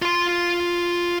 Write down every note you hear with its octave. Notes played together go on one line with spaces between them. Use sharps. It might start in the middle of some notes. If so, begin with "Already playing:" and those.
F4 C6